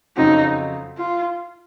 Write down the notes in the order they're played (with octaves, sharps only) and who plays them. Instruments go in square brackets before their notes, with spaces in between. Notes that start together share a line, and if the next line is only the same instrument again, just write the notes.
[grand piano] F2 C#3 F#3 C4 F#4 [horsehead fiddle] D#4
[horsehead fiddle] F4